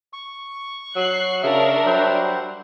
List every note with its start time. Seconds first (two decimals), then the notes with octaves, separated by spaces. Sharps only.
0.13 C#6
0.96 F#3 F#6 C7
1.43 C#3 D4 A#4 E5
1.86 F#3 G3 C5 F#5